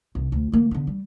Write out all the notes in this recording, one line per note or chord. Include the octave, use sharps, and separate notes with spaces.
C2
D2
D3 A#3
D3 B3
G3